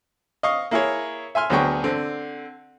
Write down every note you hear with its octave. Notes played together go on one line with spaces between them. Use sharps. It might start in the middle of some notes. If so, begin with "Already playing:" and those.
D#5 F5 C#6 D#6
A#3 E4 G#4 C#5
E5 G#5 C6 F6
D2 F#3 B3 G#4 G5 C#6
D3 C4